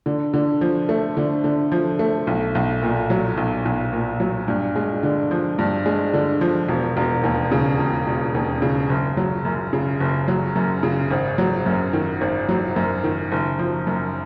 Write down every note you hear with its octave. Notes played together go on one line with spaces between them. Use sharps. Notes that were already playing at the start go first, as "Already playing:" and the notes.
D3
D3
F3
A3
D3
D3
F3
A3
B1
B1
A#2
F#3
B1
B1
A#2
F#3
G2
G#3
D3
F3
G2
G#3
D3
F3
E1
E1
D#2
C#3
E1
E1
D#2
C#3
F#1
F#3
F#2
C#3
F#1
F#3
F#2
C#3
G#1
F#3
F#2
D#3
G#1
F#3
F#2
D#3
F#1
F3
F#2